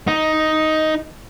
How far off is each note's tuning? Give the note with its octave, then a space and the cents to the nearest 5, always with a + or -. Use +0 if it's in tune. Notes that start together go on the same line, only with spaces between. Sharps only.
D#4 +5